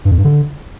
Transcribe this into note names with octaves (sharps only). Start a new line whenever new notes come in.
G2
F2
G2
D3